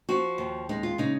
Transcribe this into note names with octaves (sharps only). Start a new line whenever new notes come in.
F3 F#4
D#2
G#3 D#4
F4
C#3 D#4